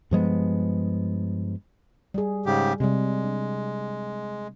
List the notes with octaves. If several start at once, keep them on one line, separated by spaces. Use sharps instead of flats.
G2 F3 G#3 B3
G3 G#4
G#2 C#3 G4
C3 G3 G#3
D4